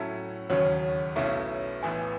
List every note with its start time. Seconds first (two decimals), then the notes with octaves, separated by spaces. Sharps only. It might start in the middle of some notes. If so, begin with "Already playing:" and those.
Already playing: A2 F#3 C#4 E4 A4
0.49 E1 D#2 C#3 F#3 C#4 C#5
1.16 B1 B2 A3 C#4 E4 E5
1.83 A1 A2 E3 B3 G#5